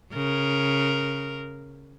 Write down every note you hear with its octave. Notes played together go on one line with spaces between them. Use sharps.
C#3 A#4